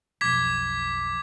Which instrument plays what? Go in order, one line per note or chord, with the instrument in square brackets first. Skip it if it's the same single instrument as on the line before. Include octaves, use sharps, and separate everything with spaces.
[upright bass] B1 F2 [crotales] D6 G#6 B6